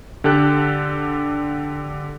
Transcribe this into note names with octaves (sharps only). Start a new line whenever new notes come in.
D3 G4 A4 F#6